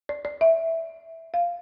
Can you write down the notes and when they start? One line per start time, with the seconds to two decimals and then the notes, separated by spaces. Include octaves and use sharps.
0.09 D5
0.25 D5
0.41 E5
1.34 F5